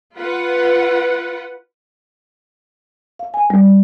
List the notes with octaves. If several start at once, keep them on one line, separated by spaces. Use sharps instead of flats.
F4 B4 F#5
F5
G#5
G3